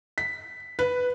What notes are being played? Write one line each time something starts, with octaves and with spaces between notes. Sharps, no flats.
B6
B4